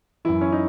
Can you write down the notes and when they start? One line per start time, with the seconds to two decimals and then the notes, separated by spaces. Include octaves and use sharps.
0.25 F#2 E3 E4
0.41 C#4
0.52 D#4